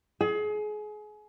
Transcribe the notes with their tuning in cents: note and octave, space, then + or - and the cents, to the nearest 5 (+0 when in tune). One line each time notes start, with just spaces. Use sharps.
G#4 +30